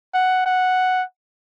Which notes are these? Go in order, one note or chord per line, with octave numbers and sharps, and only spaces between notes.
F#5
F#5